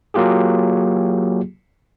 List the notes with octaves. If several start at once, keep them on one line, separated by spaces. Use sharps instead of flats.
F#3 A#3 F4 G4 G#4